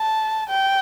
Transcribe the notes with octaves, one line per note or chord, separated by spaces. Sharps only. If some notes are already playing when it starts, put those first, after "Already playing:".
Already playing: A5
G5